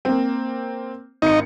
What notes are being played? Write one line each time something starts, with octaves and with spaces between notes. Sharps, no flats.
A#3 C4
G#1 D#4 C#7